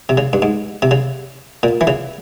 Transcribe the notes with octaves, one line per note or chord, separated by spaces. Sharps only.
C3
C#3
G2
G#2
C3
C#3
A#2
E3
C#3